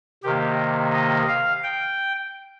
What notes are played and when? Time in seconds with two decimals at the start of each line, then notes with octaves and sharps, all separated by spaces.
0.23 C3 D#3 A#3 G4
0.93 D#5
1.28 F5
1.63 G5